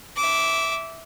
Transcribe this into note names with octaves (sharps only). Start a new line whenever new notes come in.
E5 D6